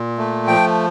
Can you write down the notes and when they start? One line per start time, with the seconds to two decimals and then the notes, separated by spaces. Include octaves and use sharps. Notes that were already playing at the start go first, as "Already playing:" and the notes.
Already playing: A#2
0.18 A3
0.47 F3 G5